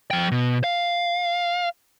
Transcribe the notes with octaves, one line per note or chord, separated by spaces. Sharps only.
F3 G5
B2
F5